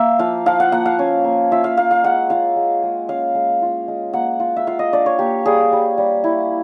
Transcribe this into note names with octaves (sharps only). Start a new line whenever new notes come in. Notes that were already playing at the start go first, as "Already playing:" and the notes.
Already playing: A#3 E5
F3 F5
F3 F5
F#5
A#3 F#5
F5
C#4
A#3
F4 E5
F5
A#3 F5
F5
G#3 F#5
F4 F5
G#3
G#3
C#4 F5
G#3
F4
G#3
A#3 F#5
F4
E5
F4 F5
D#5
D4 D5
C#5
A#3 G4
G3 G#4
G3
G3
E4